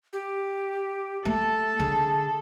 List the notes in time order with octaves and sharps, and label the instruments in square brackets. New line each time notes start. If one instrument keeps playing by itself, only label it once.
[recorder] G4
[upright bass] A3 [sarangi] A4
[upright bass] D3 [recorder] G#4